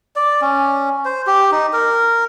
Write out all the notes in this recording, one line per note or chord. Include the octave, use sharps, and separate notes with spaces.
D5
C#4
C5
G4
D#4
A#4